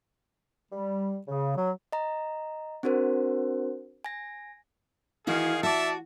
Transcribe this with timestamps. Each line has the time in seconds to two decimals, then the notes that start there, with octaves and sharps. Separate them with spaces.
0.71 G3
1.26 C#3
1.56 F#3
1.92 D#5 A#5
2.83 C4 D4 F#4 A#4 C5
4.04 G#5 A#6
5.27 D#3 E3 E4 F#4 G#4 F5
5.63 F#4 D5 E5 A5